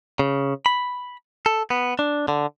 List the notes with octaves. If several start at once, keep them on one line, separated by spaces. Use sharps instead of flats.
C#3
B5
A4
B3
D4
D3